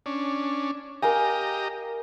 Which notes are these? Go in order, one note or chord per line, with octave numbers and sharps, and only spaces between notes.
C#4 D4
G4 A#4 D#5 F5 G#5 A#5